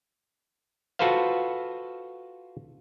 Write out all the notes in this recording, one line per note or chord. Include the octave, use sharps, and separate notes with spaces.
F4 F#4 A4 B4 C5 F5